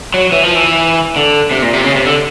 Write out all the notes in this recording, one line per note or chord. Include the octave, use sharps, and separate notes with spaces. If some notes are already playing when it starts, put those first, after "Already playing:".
F#3
E3
F3
E3
D3
C3
A#2
C3
C#3
C3
D3